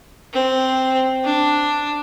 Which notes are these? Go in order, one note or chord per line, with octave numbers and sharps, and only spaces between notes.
C4
D4